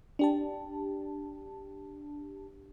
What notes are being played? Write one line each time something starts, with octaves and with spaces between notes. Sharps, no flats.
D4 G4 A5